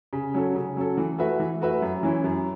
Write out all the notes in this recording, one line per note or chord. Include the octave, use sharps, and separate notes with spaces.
C#3
F#3 C#4 A4
C#3
F#3 C#4 A4
E3
A3 F#4 B4 E5
E3
A3 F#4 B4 E5
F#2
E3 C#4 E4
F#2